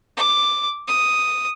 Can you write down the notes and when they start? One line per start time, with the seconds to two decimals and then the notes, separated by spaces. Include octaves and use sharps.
0.17 D6
0.88 D#6